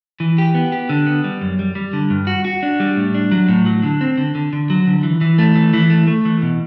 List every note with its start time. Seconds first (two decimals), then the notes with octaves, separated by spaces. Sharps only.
0.20 E3
0.38 G4
0.55 B3
0.72 G4
0.89 D3
1.07 B3
1.24 G3
1.41 F#2
1.59 G3
1.75 G3
1.93 D3
2.10 G2
2.27 F#4
2.45 F#4
2.63 D4
2.80 G3
2.96 A2
3.15 D4
3.32 F#3
3.48 A2
3.66 F#3
3.83 D3
4.01 C4
4.18 D3
4.35 D3
4.53 D3
4.70 F#3
4.87 D3
5.03 E3
5.21 E3
5.38 A3
5.56 E3
5.74 E3
5.90 A3
6.07 A3
6.25 E3
6.42 B2